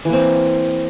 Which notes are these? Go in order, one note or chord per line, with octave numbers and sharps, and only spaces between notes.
E3 A#3 C4